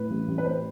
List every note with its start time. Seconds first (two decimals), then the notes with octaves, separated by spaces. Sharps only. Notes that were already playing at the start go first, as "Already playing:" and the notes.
Already playing: A2 B4
0.10 A1
0.28 A1
0.38 B4
0.46 A2 C5